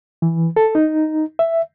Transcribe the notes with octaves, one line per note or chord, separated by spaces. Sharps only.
E3
A4
D#4
E5